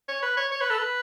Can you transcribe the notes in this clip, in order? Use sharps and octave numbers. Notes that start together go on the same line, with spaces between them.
C#5
B4
C#5
C#5
B4
A4
B4